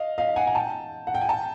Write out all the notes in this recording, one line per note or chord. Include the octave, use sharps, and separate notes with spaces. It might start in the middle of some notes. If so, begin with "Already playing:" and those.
Already playing: D#5 F5
D#5 F5
F#5 G#5
G#5
G5 A5
F#5
G5
G#5
G5 A5